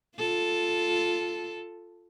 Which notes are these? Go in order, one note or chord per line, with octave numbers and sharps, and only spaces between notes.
F4 A4